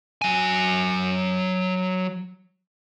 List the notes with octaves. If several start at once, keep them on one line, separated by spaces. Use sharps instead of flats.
F#3 G#5